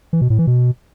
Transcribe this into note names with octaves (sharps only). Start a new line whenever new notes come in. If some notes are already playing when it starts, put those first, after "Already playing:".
E3
B2
A2
E3
B2